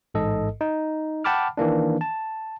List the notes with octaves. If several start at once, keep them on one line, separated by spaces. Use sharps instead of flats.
A1 G#2 A4 D#5
D#4
F#5 G5 A5 B5 D6 F6
D#3 E3 A#3 D4
A5